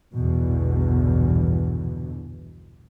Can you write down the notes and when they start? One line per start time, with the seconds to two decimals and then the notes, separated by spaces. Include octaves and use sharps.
0.13 A#1 E2 G2 B2 D3 E3